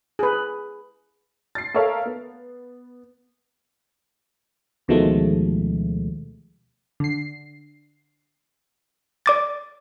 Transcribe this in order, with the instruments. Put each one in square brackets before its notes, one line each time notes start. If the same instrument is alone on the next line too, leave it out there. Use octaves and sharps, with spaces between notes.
[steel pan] G#4 B4
[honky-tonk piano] A6 C7
A4 A#4 C#5 E5 F5
B3
[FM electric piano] D2 B2 D#3 F3 G#3 A3
[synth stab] D3 C7
[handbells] D5 D6 A6